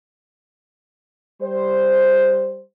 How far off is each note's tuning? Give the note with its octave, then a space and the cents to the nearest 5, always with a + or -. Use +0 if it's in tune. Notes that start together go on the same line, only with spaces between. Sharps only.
G3 +0 C5 +0